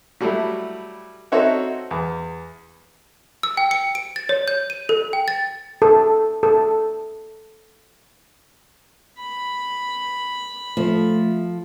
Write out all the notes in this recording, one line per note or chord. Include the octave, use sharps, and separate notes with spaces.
F#3 G3 A3 E4
C4 D#4 F#4 A4 C#5 E5
E2
E6
G5
C#7
D7
A6
C#5
G6
D#7
A4
G5
A6
A4
A4
B5
F3 A3